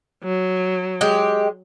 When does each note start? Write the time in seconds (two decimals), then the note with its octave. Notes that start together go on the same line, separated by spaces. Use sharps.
0.24 F#3
1.01 G#3 G4